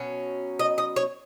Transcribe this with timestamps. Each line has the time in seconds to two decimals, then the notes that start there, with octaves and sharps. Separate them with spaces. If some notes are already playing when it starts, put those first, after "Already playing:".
Already playing: B2 F#3 C#4
0.59 D#5
0.78 D#5
0.96 C#5